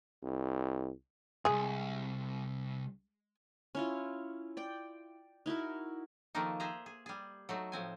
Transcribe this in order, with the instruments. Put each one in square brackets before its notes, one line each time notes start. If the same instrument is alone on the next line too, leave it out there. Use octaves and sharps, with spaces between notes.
[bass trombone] C2
[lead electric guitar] C2 G2 [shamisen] G#3 G#4
[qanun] C#4 E4 F4
D5 G5
D#4 E4 F#4 A#4
[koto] D#3 F3 A3 A#3 D#4
G#4 C5 E5 A#5
G#4
G3 G#4
F#3 A3 D#4
A2 F3 C4 G#5